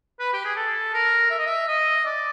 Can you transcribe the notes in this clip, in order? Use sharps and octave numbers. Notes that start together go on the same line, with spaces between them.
B4
G4
G#4
A4
A#4
E5
D#5
E5
D#5
D5